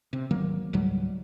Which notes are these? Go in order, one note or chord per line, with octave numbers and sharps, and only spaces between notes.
C3
G#1 D#3 F#3 A#3
C#2 G#2 F#3 G3